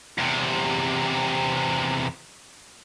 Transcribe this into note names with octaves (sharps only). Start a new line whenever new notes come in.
E2 C3